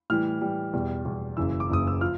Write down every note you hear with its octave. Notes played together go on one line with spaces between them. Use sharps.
A2 E3 G3 F6
A2 E3 G3
E2 B2 G3
E2 B2 G3
F#1 F#2 C#3 E3 E6
D6
F#1 F#2 C#3 E3 D#6
E6
F3 F6